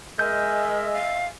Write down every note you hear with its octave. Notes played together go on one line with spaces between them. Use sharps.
G#3 A#4 D#5 E5 G#5 G6
F5